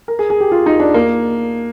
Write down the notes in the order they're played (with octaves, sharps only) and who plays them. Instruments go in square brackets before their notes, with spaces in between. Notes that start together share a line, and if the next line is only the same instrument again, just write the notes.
[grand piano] A#4
G#4
G#4
G4
F4
D#4
D4
A#3